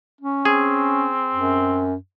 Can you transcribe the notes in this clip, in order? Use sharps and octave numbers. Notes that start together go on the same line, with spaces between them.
C#4
C4 G#4
F#2